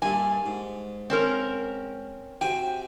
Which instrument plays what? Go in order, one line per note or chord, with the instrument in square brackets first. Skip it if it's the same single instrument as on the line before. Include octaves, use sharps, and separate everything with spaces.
[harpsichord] G2 A#2 G3 [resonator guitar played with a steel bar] G#5
[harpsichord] G#2
[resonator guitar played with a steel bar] C4 C#4 A#4
[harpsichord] C3 F#4 G#5 [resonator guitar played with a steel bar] G5